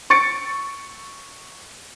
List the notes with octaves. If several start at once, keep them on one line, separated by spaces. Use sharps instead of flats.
C#6 A6 C#7 D7